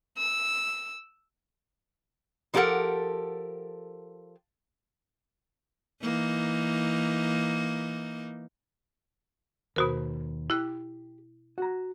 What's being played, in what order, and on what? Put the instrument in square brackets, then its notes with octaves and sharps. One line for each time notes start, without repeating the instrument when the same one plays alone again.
[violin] E6
[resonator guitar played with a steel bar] F3 D#4 G4 A4 A#4 F#5
[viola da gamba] E3 A#3 D#4
[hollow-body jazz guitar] D#2 C5 B5 [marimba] B2 F#4 A#4
[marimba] E4 F#6 [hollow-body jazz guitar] G4
[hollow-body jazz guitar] F#4 A#5